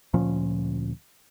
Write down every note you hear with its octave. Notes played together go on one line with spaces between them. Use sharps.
D2 A#2 F3 C#4